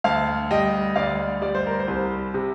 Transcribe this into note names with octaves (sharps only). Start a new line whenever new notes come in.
D2 F5 A5
G3 D#5 G5
D2 D5 F5
G3 D5
C5
A#4
C5
C2
C3